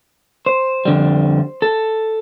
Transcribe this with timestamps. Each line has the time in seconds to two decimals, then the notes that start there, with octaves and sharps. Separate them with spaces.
0.46 C5
0.85 F2 D3 G3
1.62 A4